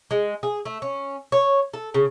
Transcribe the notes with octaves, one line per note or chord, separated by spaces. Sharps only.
G#3
G#4
A3
C#4
C#5
A4
C#3